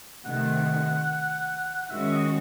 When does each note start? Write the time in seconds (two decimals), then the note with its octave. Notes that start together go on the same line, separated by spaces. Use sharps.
0.25 C3 D#3 A3 F#5
1.86 F#5
1.91 D#3 G#3 C#4 F#4 E5
2.04 E5
2.11 D#5